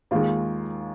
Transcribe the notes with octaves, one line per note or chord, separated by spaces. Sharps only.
D#2 D#3 G#3 F4